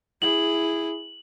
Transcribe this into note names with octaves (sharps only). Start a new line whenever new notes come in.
E4 G#4 F#7